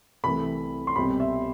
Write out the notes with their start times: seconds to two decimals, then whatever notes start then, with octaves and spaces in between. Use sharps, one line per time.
0.24 C2 C3 E3 A3 B5
0.87 C6
0.96 C2 B2 G3 C4 B5
1.20 E5